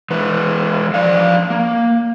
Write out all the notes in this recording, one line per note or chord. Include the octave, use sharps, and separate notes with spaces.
E3 G#3 B4
F3 D5 F5
A#3